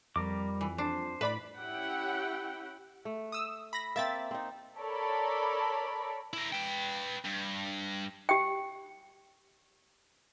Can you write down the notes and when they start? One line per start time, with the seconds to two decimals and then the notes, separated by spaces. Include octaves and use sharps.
0.16 F2 G3 A#4 D6
0.61 E3
0.78 D4 C5
1.21 A2 B4 D5 B5
1.57 C#4 E4 G4 F#5 G5
3.05 A3
3.32 D#6 E6
3.73 B5 A#6
3.96 A#3 C4 E5 A6 B6
4.31 C4 D#4
4.79 A4 A#4 C#5 D5 B5
6.33 E4 A#4
6.53 B4 G5
7.25 G2
8.29 G4 G5